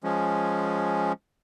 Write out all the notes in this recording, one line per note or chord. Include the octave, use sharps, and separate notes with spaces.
F3 G#3 C#4